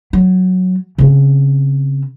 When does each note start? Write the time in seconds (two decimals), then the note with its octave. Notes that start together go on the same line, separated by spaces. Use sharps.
0.13 F#3
0.98 C#3 C4